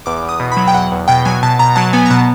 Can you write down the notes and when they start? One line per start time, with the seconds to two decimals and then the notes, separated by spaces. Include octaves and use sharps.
0.06 E2 D6
0.23 E2
0.29 D#6
0.40 B2
0.52 B5
0.57 F#3
0.68 G5
0.74 E2 F#5
0.92 E2
1.08 B2 G5
1.25 F#3 G#5
1.43 B2 A5
1.59 B2 A#5
1.76 F#3 A5
1.93 B3 G#5
2.06 A#5
2.10 B2 A5